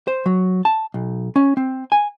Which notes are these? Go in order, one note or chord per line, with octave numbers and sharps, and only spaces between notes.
C5
F#3
A5
B1
C#4
C4
G#5